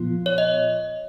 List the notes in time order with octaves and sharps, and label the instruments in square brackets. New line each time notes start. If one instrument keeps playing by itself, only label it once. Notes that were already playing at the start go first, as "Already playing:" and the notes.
Already playing: [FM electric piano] A#2 F3 B3 F4
[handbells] C#5
D#5